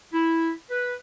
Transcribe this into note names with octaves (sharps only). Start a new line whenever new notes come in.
E4
B4